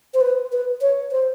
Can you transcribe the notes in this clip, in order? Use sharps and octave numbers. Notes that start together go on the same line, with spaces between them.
C5
B4
B4
C#5
C5